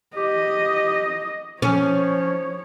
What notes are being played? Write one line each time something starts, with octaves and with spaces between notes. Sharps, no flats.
G4 D#5
F3 C#4 C#5